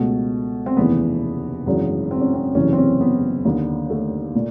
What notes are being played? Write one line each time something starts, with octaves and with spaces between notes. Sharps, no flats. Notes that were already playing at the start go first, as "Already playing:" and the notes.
Already playing: C#2 B2 A3
C4
F1 D#2 C#3 E3 B3
G#1 F#2 C#3 E3
C4
C#4
C4
F#1 E2 C3 E3 C#4
C4
C#4
B3
D#2 D3
A3
A#2